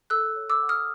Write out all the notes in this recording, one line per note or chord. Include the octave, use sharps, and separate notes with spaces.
A4 E6 F#6
C#5
D6 E6
F#5
D#6 F6